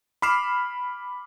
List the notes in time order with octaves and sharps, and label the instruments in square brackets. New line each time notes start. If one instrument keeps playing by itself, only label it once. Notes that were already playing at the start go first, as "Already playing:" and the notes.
[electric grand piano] B5 D6 F6 C7 E7